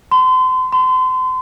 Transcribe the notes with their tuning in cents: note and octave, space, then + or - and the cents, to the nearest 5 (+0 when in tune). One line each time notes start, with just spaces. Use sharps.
C6 -35
C6 -35